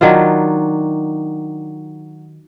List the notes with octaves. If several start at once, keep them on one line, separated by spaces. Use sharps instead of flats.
D#3 F#3 D4 F4